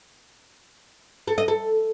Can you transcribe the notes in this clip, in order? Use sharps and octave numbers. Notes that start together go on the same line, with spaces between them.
A4
D#5
A4